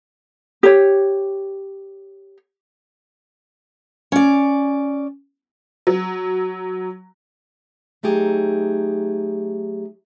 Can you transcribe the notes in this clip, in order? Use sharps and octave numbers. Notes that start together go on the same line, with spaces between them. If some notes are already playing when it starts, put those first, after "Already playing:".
G4 C#5
C#4 D5
F#3
F#3 A3 D#4 G4 G#4